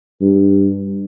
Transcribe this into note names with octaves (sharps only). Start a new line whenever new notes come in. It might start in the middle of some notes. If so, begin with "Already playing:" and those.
G2